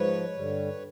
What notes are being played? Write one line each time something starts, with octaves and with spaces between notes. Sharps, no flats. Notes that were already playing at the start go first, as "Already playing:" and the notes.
Already playing: G#2 F3 B4 C#5
G2 D3 G3